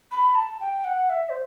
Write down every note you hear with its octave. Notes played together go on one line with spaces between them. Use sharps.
B5
A5
G5
F#5
E5
C5